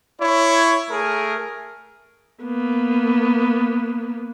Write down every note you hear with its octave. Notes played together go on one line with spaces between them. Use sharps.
E4 C#5
A3 G#4 A#4
A#3 B3